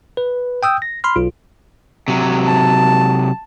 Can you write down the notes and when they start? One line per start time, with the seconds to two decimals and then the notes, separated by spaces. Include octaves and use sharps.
0.17 B4
0.63 G5 D#6 E6 G6
0.82 A#6
1.04 B5 C6 F6
1.16 B1 F4
2.08 C3 F#3
2.46 A5